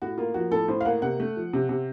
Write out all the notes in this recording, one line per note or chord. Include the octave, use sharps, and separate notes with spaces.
A2 F#4
A#3 F4
F3 F#4
A2 A4
A2 C5
F5
A#3 F#5
C3 F#5
A3
F3
C3
C3